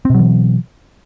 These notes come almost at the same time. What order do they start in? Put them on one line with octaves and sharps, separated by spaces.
C4 B2 F#3 E3